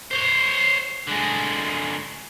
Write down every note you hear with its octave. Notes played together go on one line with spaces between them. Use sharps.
C5 C#5
D3 G#3